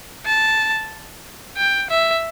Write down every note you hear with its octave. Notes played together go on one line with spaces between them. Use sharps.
A5
G5
E5